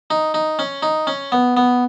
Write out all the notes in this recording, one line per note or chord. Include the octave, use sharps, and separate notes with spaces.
D#4
D#4
C#4
D#4
C#4
B3
B3